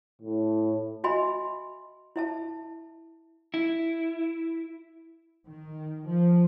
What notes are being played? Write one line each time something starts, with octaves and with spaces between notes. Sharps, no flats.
A2
F#4 D#5 E5 G#5 B5 C6
E4 E5 A5
E4
D#3
F3